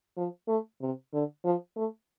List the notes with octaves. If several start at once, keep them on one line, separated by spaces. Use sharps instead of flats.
F3
A3
C3
D3
F3
A3